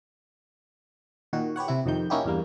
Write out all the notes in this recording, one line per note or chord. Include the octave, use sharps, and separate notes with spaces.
A#2 D#3 F#4
G4 B4 C#5 F#5
C3 E4
F2 C3 D#3 G6
A#3 C#4 D#4 E4 F#4 G4
E2 G2 G3 A#3